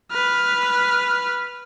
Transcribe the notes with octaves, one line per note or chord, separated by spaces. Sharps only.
B4 F6